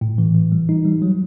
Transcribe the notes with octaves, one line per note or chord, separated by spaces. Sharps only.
A2
E3
E3
G3
D#4
G3
F#3